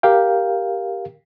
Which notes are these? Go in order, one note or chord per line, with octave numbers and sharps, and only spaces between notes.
G4 A#4 F5 G5